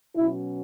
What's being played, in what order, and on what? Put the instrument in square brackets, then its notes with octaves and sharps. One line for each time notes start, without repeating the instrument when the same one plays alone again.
[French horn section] B2 F#3 C#4 E4